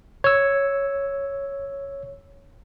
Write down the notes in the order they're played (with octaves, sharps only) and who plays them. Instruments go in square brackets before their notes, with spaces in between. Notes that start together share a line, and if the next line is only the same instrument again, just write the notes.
[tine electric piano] C#5 E6